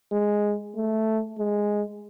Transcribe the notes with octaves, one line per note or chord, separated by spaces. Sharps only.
G#3
A3
G#3